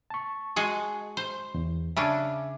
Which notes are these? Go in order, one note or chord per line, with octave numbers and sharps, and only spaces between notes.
A5 C#6
G#3 F#4 G#4
C5
E2
C#3 C#4 D4 E5